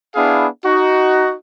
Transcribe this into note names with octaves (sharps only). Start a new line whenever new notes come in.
B3 D4 E4 G#4 F5
D#4 F#4